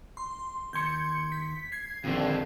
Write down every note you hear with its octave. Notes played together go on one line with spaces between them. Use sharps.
C6
D#2 C6 G6 G#6 C#7
B6
G#6 C7
A#1 F2 D3 D#3